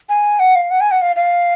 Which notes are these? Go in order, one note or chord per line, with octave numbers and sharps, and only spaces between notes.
G#5
F#5
F5
F#5
G#5
F#5
F5
F5